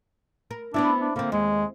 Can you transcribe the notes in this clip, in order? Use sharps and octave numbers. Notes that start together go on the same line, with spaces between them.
A#4
B3 C4 D4 E4
D4
D3 A#3 C4
D#2 G#3